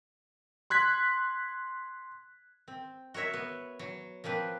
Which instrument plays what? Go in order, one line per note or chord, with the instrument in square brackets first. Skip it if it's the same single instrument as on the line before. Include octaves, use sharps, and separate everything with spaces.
[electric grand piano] C6 F#6 G#6 B6
[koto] C4
F#4 A#4 C#5 E5
B3
F#3
F3 A#3 C4 B4